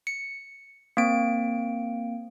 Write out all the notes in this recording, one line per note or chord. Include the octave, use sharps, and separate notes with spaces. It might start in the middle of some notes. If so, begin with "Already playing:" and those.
C#7
A#3 C4 D7